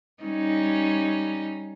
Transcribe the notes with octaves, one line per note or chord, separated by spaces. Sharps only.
G3 C#4 D#4